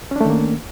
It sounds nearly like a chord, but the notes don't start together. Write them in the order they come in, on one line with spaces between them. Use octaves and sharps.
C#4 D4 A3 D#3 A#3